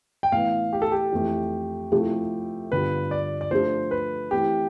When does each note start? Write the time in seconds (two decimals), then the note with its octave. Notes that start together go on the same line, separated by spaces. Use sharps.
0.23 G5
0.32 A2 E3 B3 F5
0.73 G4
0.82 A4
0.92 G4
1.12 F2 E3 A3
1.92 C3 F3 A3 E4 A4
2.71 G2 D3 G3 B3 F4 B4
3.11 D5
3.41 D5
3.51 F3 A3 D4 A4 C5
3.91 B4
4.31 E3 A3 C4 G4